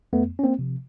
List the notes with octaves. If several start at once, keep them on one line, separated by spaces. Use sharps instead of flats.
F2 A3 B3
C#4
A#3 C4
C3 F3